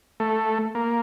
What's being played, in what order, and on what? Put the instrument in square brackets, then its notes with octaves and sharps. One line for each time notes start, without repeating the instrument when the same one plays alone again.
[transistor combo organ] A3
A#3